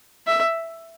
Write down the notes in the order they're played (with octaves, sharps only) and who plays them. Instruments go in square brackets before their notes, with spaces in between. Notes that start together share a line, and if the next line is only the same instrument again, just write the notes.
[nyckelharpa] E5